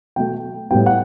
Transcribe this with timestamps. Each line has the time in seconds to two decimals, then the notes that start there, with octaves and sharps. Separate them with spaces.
0.16 B2 F#3 A3 G5
0.71 A2 G3 B3 G5
0.86 F#5